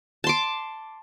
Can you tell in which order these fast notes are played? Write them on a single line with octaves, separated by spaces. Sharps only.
A5 C6 D6